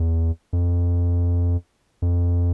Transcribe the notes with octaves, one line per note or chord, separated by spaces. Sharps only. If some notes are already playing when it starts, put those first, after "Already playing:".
Already playing: E2
F2
F2